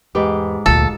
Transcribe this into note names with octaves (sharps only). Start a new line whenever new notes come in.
E2 G#2 G4 B4 D6
D2 A#2 F4 A4